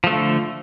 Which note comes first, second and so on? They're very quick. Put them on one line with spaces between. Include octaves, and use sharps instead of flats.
F3 A3 D3